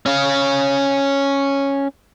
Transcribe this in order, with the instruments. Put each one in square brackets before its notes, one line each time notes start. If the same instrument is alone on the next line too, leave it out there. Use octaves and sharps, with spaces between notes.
[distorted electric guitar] C#4 F5